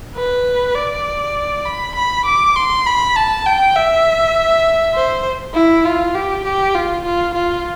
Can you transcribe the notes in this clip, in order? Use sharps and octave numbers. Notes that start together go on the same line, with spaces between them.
B4
D5
B5
B5
D6
C6
B5
A5
G5
E5
C5
E4
F4
G4
G4
F4
F4
F4